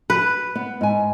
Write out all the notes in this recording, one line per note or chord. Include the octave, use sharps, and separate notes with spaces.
B4
B3
G#2 G#5